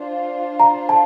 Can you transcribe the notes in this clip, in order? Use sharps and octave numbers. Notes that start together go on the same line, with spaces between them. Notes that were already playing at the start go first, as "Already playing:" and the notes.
Already playing: D4 F4 C5
A#5
A5